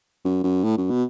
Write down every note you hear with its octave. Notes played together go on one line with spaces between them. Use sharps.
F#2
F#2
A2
F#2
B2